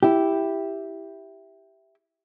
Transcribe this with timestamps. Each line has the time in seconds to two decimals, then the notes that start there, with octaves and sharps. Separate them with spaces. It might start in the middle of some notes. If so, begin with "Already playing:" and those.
0.03 E4 G4